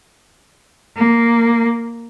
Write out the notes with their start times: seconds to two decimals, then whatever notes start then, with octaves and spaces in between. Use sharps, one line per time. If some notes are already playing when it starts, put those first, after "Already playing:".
0.96 A#3